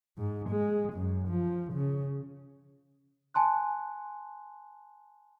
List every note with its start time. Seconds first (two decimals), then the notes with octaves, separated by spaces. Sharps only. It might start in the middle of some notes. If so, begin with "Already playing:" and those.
0.18 G#2
0.50 G#3
0.93 F#2
1.29 F3
1.73 C#3
3.34 G#5 A5 C6 F#6